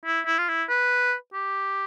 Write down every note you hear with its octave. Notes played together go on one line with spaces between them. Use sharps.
E4
E4
F4
E4
B4
G4